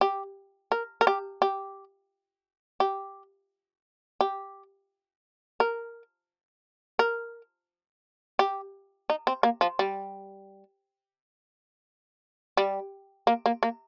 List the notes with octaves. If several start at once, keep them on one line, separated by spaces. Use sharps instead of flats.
G4
A#4
A#4
G4
G4
G4
G4
A#4
A#4
G4
D#4
C4
A#3
F3
G3
G3
A#3
A#3
A#3